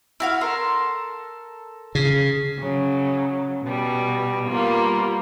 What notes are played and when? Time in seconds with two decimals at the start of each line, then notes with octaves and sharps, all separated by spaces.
0.20 E4 F#4 F5
0.41 A4 A#4 C6
1.95 C#3
2.59 C#3 F#3
3.63 B2 G3
4.48 G3 A#3 B3 F4